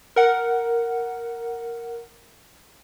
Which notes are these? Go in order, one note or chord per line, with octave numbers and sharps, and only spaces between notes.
A#4 F#5